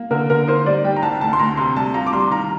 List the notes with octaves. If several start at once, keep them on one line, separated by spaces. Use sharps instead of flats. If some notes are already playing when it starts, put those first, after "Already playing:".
Already playing: A#3
D3 A#4
D3 A#4
D#4 C5
G3 D5
G3 G5
A#5
C2 A5
D2 A5
C6
D2 A#5
C3 C6
G3 A5
F4 A#5
D6
G3 C6
D#3 A#5